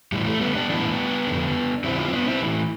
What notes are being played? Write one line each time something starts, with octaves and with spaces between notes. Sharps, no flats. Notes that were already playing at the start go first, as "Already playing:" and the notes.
A2 E3 G3
A3
G3 B3
B3 D4
A2 E3 B3 D4
F2 D3
F2 D3 C4 E4
D4 F4
C4
B3 D4
C4 E4
A2 E3